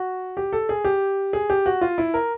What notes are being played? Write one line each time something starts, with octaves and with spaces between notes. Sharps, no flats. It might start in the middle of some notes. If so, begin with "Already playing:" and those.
Already playing: F#4
G4
A4
G#4
G4
G#4
G4
F#4
F4
E4
A#4